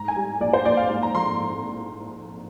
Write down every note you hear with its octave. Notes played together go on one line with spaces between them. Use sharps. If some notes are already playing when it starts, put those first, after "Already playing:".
Already playing: G#2 A#5
G#5
G3
A#1 D5
C5
A#1 D5
F5
G#2
A#5
F3 C6